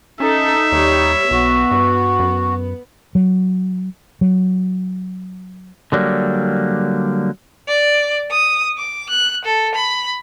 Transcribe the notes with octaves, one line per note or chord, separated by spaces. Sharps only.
C#4 D#4 A4 E5
D#2 G3 C#5
B1 B3 F#4
G2
F#2
F#3
F#3
D3 F#3 G3 A#3
D5
D#6
D6
F#6
A4
B5